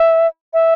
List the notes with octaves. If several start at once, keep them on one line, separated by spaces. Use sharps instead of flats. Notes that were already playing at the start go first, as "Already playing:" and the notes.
Already playing: E5
E5